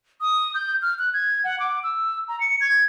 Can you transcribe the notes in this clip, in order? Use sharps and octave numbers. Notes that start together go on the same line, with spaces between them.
D#6
G6
F6
F#6
G#6
F#5
D6
E6
A#5
C#7
G#6